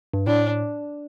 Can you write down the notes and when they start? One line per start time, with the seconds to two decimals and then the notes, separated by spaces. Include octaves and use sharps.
0.14 G2
0.27 A2 D4